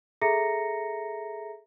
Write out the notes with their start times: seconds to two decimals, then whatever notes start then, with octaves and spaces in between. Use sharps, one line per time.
0.21 G#4 A4 E5 A#5 A#6 C#7